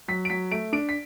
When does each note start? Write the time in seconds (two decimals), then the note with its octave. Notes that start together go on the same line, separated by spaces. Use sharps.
0.08 F#3 B6
0.25 D7
0.30 F#3 B6
0.51 A3 D7
0.73 D4 D7
0.89 B6